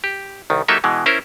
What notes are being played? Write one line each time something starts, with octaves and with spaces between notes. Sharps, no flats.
G4
C2 D#3
F#3 A#3 D#4 G4 A4 E5
B2 E3 G#3
C#4 E4 A#4 C5